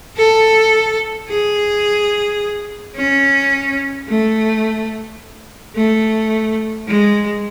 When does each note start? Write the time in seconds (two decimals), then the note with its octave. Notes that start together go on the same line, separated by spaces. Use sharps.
0.17 A4
1.29 G#4
2.96 C#4
4.08 A3
5.76 A3
6.88 G#3